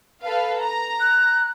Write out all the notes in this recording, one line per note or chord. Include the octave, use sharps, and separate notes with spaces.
A4 B4 F5
A#5
F#6